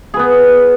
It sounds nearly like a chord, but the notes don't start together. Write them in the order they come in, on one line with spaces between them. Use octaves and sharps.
G#4 B4 B3